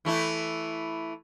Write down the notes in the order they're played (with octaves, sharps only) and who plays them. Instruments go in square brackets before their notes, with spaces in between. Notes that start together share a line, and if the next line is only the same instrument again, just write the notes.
[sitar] E3 A3 E4